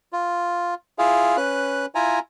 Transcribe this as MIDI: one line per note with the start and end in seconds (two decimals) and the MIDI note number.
0.13 0.74 65
0.98 1.37 64
0.98 1.37 65
0.98 1.37 68
0.98 1.37 77
1.37 1.86 61
1.37 1.86 71
1.37 1.86 90
1.95 2.19 64
1.95 2.19 65
1.95 2.19 80
1.95 2.19 82